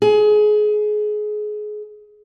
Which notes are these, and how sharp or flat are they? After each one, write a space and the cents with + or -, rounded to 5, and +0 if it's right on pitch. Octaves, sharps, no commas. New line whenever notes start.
G#4 +25